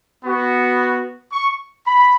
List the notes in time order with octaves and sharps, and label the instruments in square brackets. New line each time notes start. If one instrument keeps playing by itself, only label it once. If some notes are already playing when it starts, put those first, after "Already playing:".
[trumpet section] B3 F#4
C#6
B5